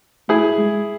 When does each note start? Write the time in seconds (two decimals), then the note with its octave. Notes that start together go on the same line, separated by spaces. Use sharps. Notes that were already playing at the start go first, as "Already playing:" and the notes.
0.29 A3 E4 G#4
0.58 G#3